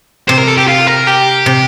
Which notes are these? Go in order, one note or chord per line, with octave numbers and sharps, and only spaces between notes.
C3 C5
A#4
A4
G4
F4
A#4
G4
C3